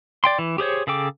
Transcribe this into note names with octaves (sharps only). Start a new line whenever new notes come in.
D5 G5 C6
E3
G4 G#4 C5 C#5
C#3 G#4 A4 G5 D6